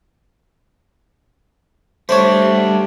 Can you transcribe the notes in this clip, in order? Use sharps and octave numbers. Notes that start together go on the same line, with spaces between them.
G3 A3 D4 C5 C#5